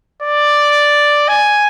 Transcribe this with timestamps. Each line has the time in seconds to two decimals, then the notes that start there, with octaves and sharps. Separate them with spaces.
0.22 D5
1.28 G#5